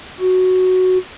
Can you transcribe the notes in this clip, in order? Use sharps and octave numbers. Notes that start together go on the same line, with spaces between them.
F#4